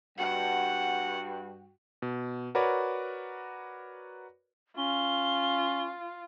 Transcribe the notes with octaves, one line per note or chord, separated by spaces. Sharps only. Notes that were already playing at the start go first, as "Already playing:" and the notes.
G2 F#4 F#5 G5
B2
F#4 A#4 B4 C#5 D5
C#4 F4 G7